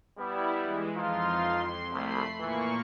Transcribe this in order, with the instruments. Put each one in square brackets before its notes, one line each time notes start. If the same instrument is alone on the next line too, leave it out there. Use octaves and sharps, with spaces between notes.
[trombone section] G3 B3 [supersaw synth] E4
[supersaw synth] E3 G#3
[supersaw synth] F2 C6 [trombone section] F3 D#4 F4
[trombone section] C2 [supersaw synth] A3 B5 C7
[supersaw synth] A#2 A#3 C#6 [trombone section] E3